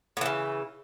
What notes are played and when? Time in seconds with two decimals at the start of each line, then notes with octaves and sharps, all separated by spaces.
0.17 A2
0.21 E3
0.26 C#3